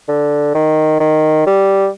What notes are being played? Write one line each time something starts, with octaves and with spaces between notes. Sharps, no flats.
D3
D#3
D#3
G3